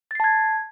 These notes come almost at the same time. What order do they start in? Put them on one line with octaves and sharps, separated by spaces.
A6 C7 A5 G#6